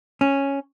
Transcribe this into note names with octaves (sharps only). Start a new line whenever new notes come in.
C#4